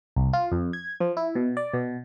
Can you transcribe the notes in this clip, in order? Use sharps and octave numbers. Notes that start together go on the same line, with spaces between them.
C2
F4
F2
G#6
F3
E4
B2
D5
B2